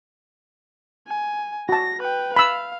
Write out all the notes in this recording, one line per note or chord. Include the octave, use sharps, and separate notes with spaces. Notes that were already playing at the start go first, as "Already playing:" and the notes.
G#5
F#4 A5 A#6
B4 G5
F5 B5 E6